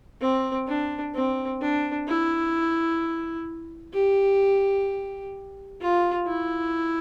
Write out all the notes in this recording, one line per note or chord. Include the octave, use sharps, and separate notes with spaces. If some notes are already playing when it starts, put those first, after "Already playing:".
C4
D4
C4
D4
E4
G4
F4
E4